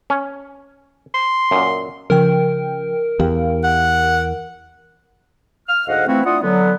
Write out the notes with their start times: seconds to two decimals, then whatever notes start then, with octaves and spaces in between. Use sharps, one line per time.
0.10 C#4
1.14 C6
1.51 F#2 A#2
2.10 C#3 F3 A#4 G5
3.20 E2 G4 F5
3.64 F#5
5.68 F6
5.88 D2 G#2 D#5 F5 F#5
6.08 E3 F3 A3 C4 E4 F#4
6.25 D4 E4 F4 F#5 D#6
6.43 D3 F#3 B3